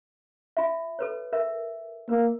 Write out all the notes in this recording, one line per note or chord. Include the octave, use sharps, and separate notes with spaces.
F4 E5
A4 B4 C#5
A#4 E5
A#3 A#4